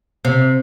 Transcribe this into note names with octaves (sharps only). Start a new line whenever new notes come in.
C3